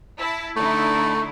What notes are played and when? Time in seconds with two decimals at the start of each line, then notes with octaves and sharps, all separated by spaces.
0.19 E4 A5
0.56 D3 A3 D#4 E4